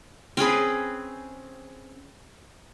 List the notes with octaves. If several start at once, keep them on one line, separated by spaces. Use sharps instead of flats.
C4 C#4 G#4 B4